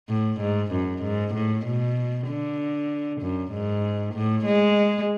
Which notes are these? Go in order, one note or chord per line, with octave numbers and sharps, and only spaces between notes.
A2
G#2
F#2
G#2
A2
B2
D3
F#2
G#2
A2
G#3